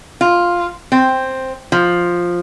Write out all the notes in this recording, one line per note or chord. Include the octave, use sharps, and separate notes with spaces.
F4
C4
F3